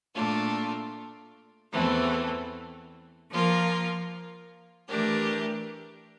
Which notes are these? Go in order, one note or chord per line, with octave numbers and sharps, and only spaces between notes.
A#2 A3 D4 F4
E2 E3 A3 C4
F3 A#3 F4 A#4
E3 A3 D4 G4 A#4